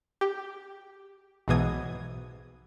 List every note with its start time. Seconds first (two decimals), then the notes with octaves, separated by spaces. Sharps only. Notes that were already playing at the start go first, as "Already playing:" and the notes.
0.21 G4
1.48 B1 G#2 B2 E3 D#6 G#6